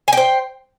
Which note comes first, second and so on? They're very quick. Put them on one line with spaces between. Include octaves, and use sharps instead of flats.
G#5 G5 C5